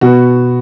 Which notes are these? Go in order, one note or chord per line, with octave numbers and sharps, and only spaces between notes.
B2 B3 F#4